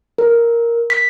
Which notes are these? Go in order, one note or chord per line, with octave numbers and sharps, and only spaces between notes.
A#4
B6